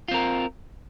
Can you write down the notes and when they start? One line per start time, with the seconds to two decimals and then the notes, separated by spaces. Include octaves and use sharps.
0.08 F4
0.11 C4
0.14 A#4